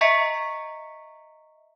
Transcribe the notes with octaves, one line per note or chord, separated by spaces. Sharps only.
D#5 E5 A#5 C#6 B6 C#7